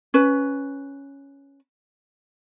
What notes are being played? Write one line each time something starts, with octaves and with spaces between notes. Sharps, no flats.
C#4 B4